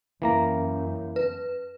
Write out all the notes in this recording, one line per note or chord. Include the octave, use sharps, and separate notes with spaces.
F#2 E3 A#3 A#5
B4